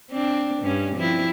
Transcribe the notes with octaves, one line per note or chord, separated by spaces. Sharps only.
C4 D4
G2 C#4
F3 C4 E4